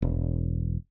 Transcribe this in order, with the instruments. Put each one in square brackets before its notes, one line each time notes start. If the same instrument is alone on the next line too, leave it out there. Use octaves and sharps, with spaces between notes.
[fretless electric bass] E1